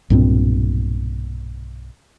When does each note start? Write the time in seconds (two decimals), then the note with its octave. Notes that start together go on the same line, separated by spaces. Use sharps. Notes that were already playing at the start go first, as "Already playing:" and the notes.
0.10 B1 G2 A#2 C4